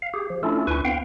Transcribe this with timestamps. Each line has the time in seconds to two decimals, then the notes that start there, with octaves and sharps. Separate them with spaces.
0.02 F5
0.14 G4 G#4
0.30 F3
0.43 A3 C#4 D4 E4 F4 A4
0.67 D2 D4 E4 B4 G#5 C#6
0.85 B3 C4 F5 G5